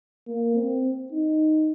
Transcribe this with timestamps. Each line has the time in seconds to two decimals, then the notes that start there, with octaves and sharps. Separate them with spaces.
0.27 A#3
0.55 C4
1.12 D#4